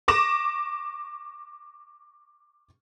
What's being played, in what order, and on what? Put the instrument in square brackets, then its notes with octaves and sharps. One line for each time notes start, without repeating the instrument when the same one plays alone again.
[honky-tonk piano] C#6 D6 A#6 E7